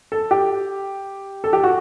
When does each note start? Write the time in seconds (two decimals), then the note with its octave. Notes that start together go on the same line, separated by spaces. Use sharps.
0.12 A4
0.31 G4
1.44 A4
1.53 G4
1.64 F#4